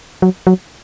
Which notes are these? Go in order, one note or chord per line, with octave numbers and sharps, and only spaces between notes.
F#3
F#3